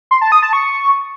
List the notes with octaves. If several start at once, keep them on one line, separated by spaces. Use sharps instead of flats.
C6
A5
D#6
A5
C#6